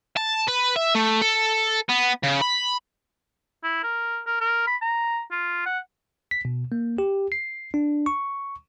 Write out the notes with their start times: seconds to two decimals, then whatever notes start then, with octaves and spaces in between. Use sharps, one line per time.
0.17 A5
0.48 B4
0.76 E5
0.95 A3
1.22 A4
1.89 B3
2.24 C#3
2.42 B5
3.63 E4
3.83 A#4
4.26 A#4
4.40 A#4
4.67 B5
4.82 A#5
5.31 F4
5.66 F#5
6.31 B6
6.45 B2
6.72 A#3
6.98 G4
7.32 C7
7.74 D4
8.06 C#6